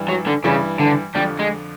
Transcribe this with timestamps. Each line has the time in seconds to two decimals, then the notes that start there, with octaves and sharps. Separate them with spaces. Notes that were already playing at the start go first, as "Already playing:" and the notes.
Already playing: G2 E3 G3
0.09 F#3
0.27 D3
0.44 G2 C#3 E3 G3
0.80 D3
1.14 F2 D3 F3 G3
1.39 G#3